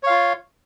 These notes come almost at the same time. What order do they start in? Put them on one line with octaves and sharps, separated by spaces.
C#5 F5 F4